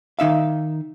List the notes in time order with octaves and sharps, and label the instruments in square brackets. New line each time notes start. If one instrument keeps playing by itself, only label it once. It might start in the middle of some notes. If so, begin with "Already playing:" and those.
[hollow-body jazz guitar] D#3 D#4 E5 F5